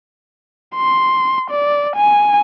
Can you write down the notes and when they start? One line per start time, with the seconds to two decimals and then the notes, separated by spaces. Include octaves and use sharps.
0.76 C6
1.51 D5
1.96 G#5